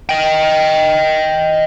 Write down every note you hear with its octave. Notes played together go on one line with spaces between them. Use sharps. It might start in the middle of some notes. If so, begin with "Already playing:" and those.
D#5 G5